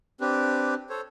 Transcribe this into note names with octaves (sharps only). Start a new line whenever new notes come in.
C4 D4 G4 B4
A4 C5 C#5